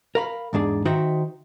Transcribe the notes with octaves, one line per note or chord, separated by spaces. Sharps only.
A#4 F5 B5
E2 G#2 D4 G#4
D#3 D#4 F#4 C5 E5 G5